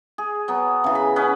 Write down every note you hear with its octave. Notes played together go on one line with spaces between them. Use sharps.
G#4
F#3 B3
C#3 E3
B5
C#4 B4 D#5 G#5